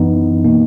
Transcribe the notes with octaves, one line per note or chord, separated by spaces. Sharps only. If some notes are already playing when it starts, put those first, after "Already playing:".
Already playing: F#2 E3 B3 D#4
B2 A#3 D#4